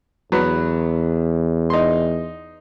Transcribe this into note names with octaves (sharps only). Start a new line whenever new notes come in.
E2 F#3 B3
D#4 C6